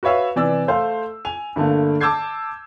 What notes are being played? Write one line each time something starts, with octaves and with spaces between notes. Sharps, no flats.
F#4 B4 C#5 E5 F5
C3 E3 D5 E6
A3 C5 F5
G#5 F7
G2 D3 A3 A#3
A5 D6 E6 G6 G#6 C7